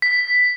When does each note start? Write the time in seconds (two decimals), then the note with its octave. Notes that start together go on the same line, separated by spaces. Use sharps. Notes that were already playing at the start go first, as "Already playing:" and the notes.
0.02 B6